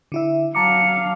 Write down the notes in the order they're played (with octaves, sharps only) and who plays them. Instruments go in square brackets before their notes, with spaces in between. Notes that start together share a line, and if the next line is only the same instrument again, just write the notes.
[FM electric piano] D3 E4 E5
[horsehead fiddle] F#3 F5 [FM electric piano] A5 A#5 D6 [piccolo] C#7